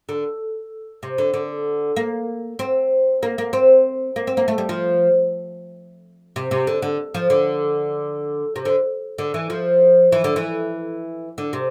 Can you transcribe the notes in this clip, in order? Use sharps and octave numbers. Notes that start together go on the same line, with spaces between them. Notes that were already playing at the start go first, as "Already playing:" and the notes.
D3
C3
D3
D3
A#3
C4
A#3
A#3
C4
A#3
C4
A#3
A3
G3
F3
C3
C3
D3
D3
F3
D3
C3
D3
D3
E3
F3
E3
D3
E3
D3
C3